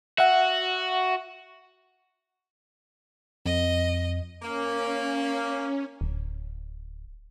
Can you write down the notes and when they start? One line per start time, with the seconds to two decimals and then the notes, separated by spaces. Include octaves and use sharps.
0.18 F#4 E5 F#5
3.46 F2 D#5
4.42 A#3 C#4
6.01 D1